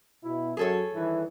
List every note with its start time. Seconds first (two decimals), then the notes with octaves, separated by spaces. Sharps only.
0.23 B2 E4
0.57 F#2 G#4 A4 C#5
0.93 G2 D#3 E3